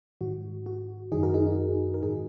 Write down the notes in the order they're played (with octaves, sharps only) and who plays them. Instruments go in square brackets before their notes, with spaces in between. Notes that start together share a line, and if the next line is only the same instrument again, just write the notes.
[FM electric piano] G#2 D#3 F#4
F#4
F#2 D#3 D#4 G#4
F#4 A#4
D#4 G#4
D#4
A#4
G#2 D#3 D#4 G#4